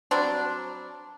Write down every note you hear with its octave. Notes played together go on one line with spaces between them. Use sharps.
F#3 G3 C4 D4